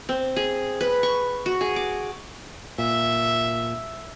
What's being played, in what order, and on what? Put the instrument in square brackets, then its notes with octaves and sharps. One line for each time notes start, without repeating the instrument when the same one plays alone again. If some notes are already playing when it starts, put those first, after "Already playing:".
[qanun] C4
G#4
B4
C#6
F#4
G#4
D6
[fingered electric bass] A#2 [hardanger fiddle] E5